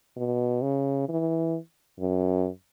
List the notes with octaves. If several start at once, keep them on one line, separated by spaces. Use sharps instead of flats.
B2
C#3
E3
F#2